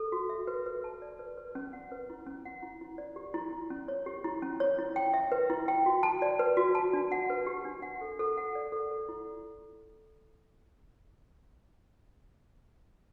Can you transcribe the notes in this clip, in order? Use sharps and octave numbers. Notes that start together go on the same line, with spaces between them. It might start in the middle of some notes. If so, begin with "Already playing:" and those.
Already playing: A4
F#4
E5
B4
B4
A5
D5
B4
B4
C#4
F#5
B4
E4
C#4
F#5
E4
E4
D5
G4
E4
E4
C#4
C#5
G4
E4
C#4
C#5
E4
G5
E5
B4
E4
G5
F#4
A5
D5
B4
F#4
A5
D4
F#5
B4
G4
D4
F#5
A4
A4
F#5
D5
A4
A4
E4